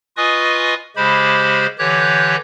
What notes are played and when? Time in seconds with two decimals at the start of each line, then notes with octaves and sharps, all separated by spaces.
0.17 F4 B4 D#5 G#5 C#6 D#6
0.96 C#3 G#3 G4 C5 B5
1.79 D3 E3 G4 C#5 F#6 G6